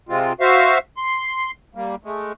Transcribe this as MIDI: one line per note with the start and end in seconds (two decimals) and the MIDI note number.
0.09 0.33 48
0.09 0.33 56
0.09 0.33 60
0.09 0.33 65
0.40 0.78 66
0.40 0.78 72
0.40 0.78 76
0.40 0.78 77
0.97 1.51 84
1.75 1.95 55
1.75 1.95 58
2.04 2.32 56
2.04 2.32 57